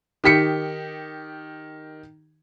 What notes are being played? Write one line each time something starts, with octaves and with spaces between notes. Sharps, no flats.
D#3 G4 B6 C#7